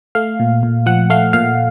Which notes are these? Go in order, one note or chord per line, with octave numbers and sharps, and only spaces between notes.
A3 F5
A#2
A#2
F3 F#5
A3 F5
A#2 F5